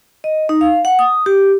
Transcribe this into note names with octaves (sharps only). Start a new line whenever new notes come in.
D#5
D#4
F5
F#5
D#6
G4